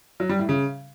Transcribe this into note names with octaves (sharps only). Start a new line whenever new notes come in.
F#3
G3
A2
C#3